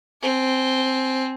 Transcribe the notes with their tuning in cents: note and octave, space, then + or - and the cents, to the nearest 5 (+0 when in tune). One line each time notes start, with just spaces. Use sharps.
C4 +0 G#5 +30